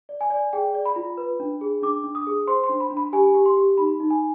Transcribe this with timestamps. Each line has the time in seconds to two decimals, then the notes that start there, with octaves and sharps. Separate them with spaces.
0.09 D5
0.21 G#5
0.30 D5
0.53 G#4 G5
0.74 D5
0.85 B5
0.96 F4
1.17 B4
1.40 D4
1.61 G#4
1.82 D4 D6
2.04 D4
2.15 D#6
2.27 G#4
2.47 C5 C6
2.64 C6
2.69 D4
2.80 B5
2.91 D4
2.97 B5
3.13 G4 G#5
3.34 G4
3.46 C6
3.57 G4
3.78 D#4 B5
4.00 D#4
4.10 G#5